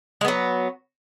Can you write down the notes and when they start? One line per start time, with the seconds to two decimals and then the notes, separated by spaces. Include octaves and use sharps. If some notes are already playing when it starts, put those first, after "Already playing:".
0.21 G#3
0.25 B3
0.28 F#3